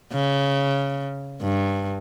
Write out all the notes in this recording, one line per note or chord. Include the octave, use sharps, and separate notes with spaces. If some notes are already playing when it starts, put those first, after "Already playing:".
C#3
G2